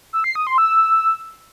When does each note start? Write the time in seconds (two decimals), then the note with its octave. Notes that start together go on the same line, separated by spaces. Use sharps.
0.13 E6
0.24 C7
0.35 D#6
0.47 C6
0.58 E6